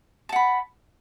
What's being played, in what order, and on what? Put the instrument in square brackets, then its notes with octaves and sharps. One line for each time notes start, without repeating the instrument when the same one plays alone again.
[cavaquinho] A5
F#5
B5